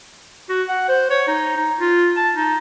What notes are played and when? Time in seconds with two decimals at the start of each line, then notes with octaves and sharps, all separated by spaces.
0.49 F#4
0.69 F#5
0.89 C5
1.11 C#5
1.28 D#4
1.57 D#4
1.80 F4
2.17 A5
2.36 D#4